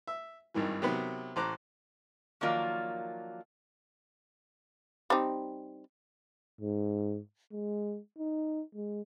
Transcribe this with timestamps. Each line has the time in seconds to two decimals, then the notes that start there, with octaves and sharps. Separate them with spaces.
0.07 E5
0.54 G#1 G2 D#3 E3
0.82 C3 D#3 F#3 B3 B5
1.36 A1 C5 A#5 D6 F#6
2.41 D#3 F3 F#3 A#3 F4 D5
5.10 G3 C4 D#4
6.61 G#2
7.52 G#3
8.18 D#4
8.75 G#3